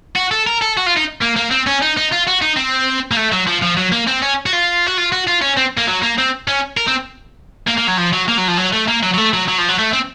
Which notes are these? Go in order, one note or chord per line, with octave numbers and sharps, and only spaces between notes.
F#4
A4
A#4
A4
F#4
F4
D#4
A#3
A#3
C4
C#4
D#4
D#4
F4
F#4
D#4
C4
A#3
A3
F#3
F3
F3
F#3
A#3
C4
C#4
F#4
F4
F#4
F4
F#4
F4
C#4
C4
A#3
F#3
A#3
C4
C#4
A#4
C4
A#3
A#3
F#3
F3
F#3
A#3
F#3
F3
F#3
A3
A#3
F#3
F#3
A3
F#3
F#3
F3
F#3
A3
C4